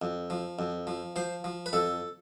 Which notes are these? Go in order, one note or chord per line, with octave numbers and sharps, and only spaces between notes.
F2
F3
F2
F3
F3 C5
F3
B4
F2 A4